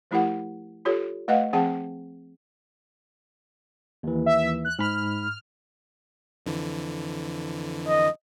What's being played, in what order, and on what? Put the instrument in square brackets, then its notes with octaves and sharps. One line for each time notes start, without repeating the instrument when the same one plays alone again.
[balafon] F3 A3 E4 G4 A#4 F#5
F4 G4 A4 C#5
A3 B4 D#5 F5 F#5
F3 C4 G#4 F#5 A5
[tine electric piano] D#2 E3
[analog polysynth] E5
F#6
[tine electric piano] G#2 B5 [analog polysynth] F6
[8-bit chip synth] F2 D3 E3
[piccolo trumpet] D#5